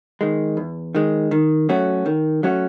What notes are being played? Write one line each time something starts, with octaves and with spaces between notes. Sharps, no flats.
D#3 G#3
E2
D#3 G#3
D#3
F#3 A3 C#4 F#4
D#3
F#3 A3 C#4 F#4